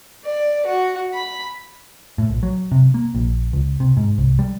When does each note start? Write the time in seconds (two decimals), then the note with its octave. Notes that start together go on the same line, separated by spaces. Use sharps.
0.25 D5
0.66 F#4
1.14 B5
2.18 A2
2.30 A#1
2.43 F#3
2.72 C3
2.94 A#3
3.14 A#1
3.53 C#2
3.80 C3
3.97 G#2
4.18 C2
4.39 G3